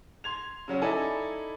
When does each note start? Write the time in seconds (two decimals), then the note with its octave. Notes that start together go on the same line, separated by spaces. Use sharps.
0.24 C6 G#6 F7
0.68 C#3 F#3 C#4
0.82 D#4 E4 A4 D5 G#5